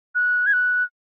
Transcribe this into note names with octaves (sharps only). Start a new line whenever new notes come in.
F#6
G#6
F#6